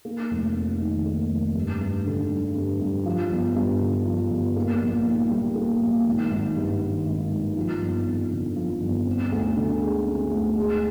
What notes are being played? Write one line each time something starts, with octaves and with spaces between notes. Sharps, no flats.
A#3
F1
F2
D#3
A#3
F1
G2
G2
D3
G3
G2
G2
F3
G1
G2
D3
F3
G1
A#3
A#1
G#2
G3
A#3
A#1
G#1
G#1
G2
D#3
G#1
G#1
F3
G1
F2
D3
F3
G1
C4
D2
D3
G#3
C4
D2
G#3